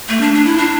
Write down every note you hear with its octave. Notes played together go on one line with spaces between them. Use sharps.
A3
D4
D4
E4
D4